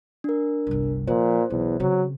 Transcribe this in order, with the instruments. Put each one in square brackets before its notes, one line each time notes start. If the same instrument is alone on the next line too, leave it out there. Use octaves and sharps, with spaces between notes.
[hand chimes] D4 A#4
[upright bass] G1 C2
[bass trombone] A#2 [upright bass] F3 [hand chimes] C5
[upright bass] B1 [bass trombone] E2
[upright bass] C#3 C4 [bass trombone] F#3